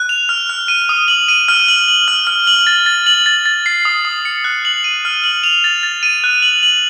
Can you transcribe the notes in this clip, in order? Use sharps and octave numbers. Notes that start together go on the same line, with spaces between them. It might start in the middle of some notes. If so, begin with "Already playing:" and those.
Already playing: F#6
F7
F6
F6
D#7
D#6
F#7
D#7
F6
F#7
F#7
F6
F6
F#7
A6
A6
F#7
A6
A6
C7
D#6
D#6
C#7
F#6
F#7
D#7
F6
F#7
F7
A6
A6
D#7
F#6
F#7
F#7